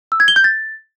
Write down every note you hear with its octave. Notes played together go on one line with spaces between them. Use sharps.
E6
G#6
G7
G6
A6